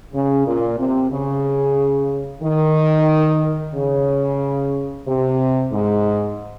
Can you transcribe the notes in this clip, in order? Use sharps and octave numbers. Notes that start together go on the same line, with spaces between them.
C#3
A#2
C3
C#3
D#3
C#3
C3
G#2